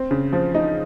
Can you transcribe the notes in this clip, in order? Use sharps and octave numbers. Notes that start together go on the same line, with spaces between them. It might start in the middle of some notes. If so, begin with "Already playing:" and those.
Already playing: C4
C#3
F3
D#4